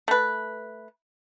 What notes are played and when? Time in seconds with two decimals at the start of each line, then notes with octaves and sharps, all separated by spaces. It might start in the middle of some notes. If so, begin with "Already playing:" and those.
0.08 A3 B4